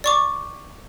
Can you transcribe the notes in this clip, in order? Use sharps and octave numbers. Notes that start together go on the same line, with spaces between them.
D5 C#6 D6